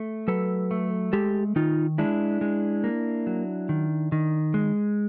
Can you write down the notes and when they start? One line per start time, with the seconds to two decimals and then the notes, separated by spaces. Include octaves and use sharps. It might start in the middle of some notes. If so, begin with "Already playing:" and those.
Already playing: A3
0.28 F#3 A4 B4
0.71 A3
1.13 G#3 G4 A4
1.56 D#3 D#4 F4
1.98 G#3 D4 E4
2.41 G#3
2.84 A#3
3.27 F#3
3.69 D#3
4.12 D#3
4.54 G#3